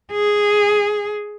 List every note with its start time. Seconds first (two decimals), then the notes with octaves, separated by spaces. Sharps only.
0.12 G#4